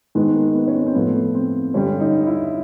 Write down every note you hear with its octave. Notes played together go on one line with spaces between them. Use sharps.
G#2 D#3 G#3 B3
A#3
B3
C#4
C4
C4
A2 F3 A3 B3
C4
G2 D3 G3 C#4
D#4
E4